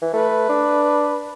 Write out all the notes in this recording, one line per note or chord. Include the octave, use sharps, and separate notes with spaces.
E3
A3 B4
D4